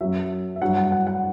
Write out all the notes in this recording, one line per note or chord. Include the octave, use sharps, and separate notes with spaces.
F#2 F#3 E5
E5
G2 F#3 F#5
F#5
F#5
F#5